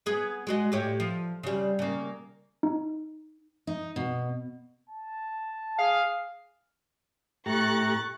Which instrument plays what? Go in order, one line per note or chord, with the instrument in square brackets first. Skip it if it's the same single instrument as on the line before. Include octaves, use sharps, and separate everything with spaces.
[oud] B3 G#4
G#3 F#4 D#5
A2 G4 C#5
F3
C#3 G3
C#3 A#3
[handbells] D#4
[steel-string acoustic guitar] D#4
B2
[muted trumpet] A5
[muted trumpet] G#4 [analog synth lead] F5
[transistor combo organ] A2 G4 A#5 [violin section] C#6 F#6 A6